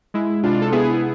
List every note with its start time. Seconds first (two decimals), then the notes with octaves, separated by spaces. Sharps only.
0.14 G#3 E4
0.43 C3 D4 F4
0.62 A4
0.72 B3 E4 G#4